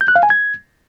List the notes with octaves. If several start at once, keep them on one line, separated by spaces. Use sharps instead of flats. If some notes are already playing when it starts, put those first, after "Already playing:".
G6
F#6
F5
G#5
G#6